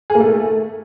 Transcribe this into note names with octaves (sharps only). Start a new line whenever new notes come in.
G#4
A#3
A3